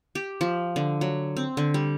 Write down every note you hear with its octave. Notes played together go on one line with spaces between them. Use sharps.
G4
F3
D3
F#3
C4
D3
G3